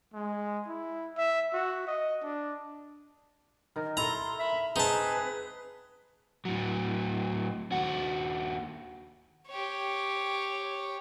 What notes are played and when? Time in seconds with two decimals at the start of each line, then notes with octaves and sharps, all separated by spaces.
0.13 G#3
0.68 E4
1.17 E5
1.53 F#4
1.87 D#5
2.23 D4
3.76 D#3 A#4
3.97 E4 A4 A#4 A#5 C6
4.39 E5 B5
4.76 C4 D#4 G#4 B4 A5
6.45 A2 F#3
7.72 D#2 F#4
9.47 G4 C#5